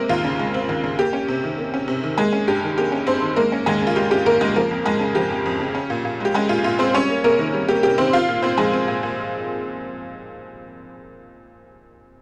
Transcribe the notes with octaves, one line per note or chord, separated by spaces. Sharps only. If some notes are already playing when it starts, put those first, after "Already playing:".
Already playing: C3 G#3 A#3 C4 A#4
D#2 F4
C#3
G#3
C4
D#2
C#3
A#3 G4
C#4
C3
D#3
A#3
C#4
C3
D#3
G#3 A#3 G#4
C#4
G2 G4
D#3
A#3 G4
C#4
G2 C4 C5
D#3
G#3 A#3 A#4
C#4
D#2 G#3 G#4
C#3
F4
G#3 G4
C#4 G4
D#2 A#3 A#4
C#3 G#3 G#4
F3 A#3 A#4
F2
F2 G#3 G#4
C#3
F3 G4
F2
F2
C#3
C#4
A#2
A#2
G#3 G4
G#3 C#4 G#4
A#2 F4
A#2 F4
G#3 C4 C5
G3 C#4 C#5
A#3
C3 A#3 A#4
D#3
G3
A#3 G4
C3 G4
D#3 C4 C5
C4 F4 F5
A#2
A#2 C4 C5
F3 G#3 G#4
C4
A#2
A#2